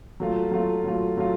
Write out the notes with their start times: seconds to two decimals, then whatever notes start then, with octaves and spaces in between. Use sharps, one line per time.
0.20 F#3 A3 F4
0.51 F#3 A3 F4
0.84 F#3 A3 F4
1.17 F#3 A3 F4